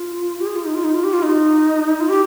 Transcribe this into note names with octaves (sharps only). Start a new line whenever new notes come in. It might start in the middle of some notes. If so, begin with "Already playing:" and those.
Already playing: F4
G4
G#4
F4
D#4
F4
D#4
F4
G4
F4
D#4
F4
G4